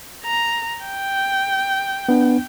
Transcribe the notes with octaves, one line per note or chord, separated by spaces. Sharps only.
A#5
G5
B3 D4